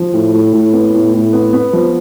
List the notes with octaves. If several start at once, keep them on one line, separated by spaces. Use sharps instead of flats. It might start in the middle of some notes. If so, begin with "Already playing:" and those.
Already playing: F3
A2
A2
A2
B3
A2
A2
B3
B3
F3